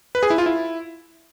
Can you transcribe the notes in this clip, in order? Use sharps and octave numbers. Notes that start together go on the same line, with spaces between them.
B4
G#4
E4
F4
E4